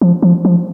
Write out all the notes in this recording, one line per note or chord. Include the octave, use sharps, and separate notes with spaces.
F3
F3
F3